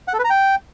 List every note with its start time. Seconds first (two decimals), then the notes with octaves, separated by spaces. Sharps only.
0.08 F#5
0.13 A4
0.19 B4
0.24 A#5
0.30 G5